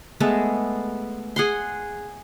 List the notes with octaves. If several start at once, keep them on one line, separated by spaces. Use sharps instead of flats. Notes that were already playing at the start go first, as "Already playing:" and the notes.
G#3 A3 B3 A4
G#4 F#5 C6